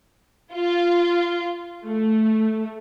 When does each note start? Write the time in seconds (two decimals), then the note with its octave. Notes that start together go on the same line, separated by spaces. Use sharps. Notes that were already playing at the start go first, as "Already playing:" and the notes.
0.54 F4
1.85 A3